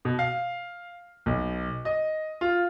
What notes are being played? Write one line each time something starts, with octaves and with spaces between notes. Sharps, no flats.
B2
F5
B1
D#5
F4